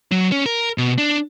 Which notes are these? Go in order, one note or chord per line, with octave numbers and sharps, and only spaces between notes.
F#3
C#4
A#4
B2
D4